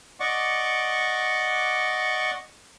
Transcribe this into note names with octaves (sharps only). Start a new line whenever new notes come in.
D5 D#5 F#5 C#6 D6